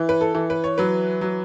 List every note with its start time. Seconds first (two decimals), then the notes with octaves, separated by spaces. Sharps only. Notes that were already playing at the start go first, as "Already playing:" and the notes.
Already playing: E3
0.09 B4
0.21 A4
0.35 E3
0.50 B4
0.64 C#5
0.78 F#3 B4
1.21 F#3